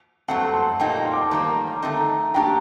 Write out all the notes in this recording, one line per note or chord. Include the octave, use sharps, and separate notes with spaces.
G2 F#3 A3 C4 F#5 A5
A5 C6
A#2 G3 A#3 D#4 G5
C6
D6
A5 C6
D#3 G3 A#3 A#5 D6
D3 A3 C4 D#4
F#3 A#3 D4 G4 G5 A#5